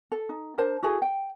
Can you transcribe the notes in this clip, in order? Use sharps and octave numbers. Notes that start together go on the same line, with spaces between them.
A4
D#4
D4 A#4 C5 A5
E4 F#4 G#4 A4
G5